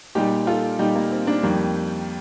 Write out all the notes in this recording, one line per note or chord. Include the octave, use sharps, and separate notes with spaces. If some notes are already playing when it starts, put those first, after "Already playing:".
A#2 G3 D#4 G4
F4 A4
A#2 G3 D#4 G4
A#3
C4
A#3 D4
F2 D#3 G3 A#3